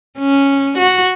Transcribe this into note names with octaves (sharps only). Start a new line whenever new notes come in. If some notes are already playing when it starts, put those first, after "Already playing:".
C#4
F#4